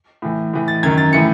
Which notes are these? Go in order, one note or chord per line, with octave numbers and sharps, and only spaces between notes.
A2 E3
A2 E3
A6
F#2 D#3 G#6
A6
A2 E3 C#7